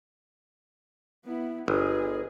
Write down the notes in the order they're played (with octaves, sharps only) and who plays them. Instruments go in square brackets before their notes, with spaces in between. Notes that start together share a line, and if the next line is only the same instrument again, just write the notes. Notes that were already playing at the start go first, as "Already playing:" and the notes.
[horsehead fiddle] B3 E4
[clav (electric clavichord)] G1 [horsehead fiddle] G#4 D#5